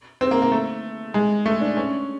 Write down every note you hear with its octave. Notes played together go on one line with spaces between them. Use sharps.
C4
A#3
A#3
A3
G#3
A3
D4
C#4